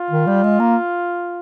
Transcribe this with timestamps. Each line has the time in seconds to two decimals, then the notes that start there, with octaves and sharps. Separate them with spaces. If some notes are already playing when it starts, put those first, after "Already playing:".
Already playing: F4
0.11 D#3
0.27 G3
0.43 G#3
0.59 A#3